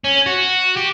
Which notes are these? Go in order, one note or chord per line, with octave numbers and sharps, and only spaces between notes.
C#4
F#4
G4